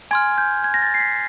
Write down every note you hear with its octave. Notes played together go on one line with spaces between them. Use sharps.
G#5 C6 F6 G#6
G6
G#6
A#6
A6
C7
B6